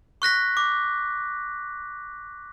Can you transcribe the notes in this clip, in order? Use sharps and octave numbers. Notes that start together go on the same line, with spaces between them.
C#6 F#6 A#6 B6
D6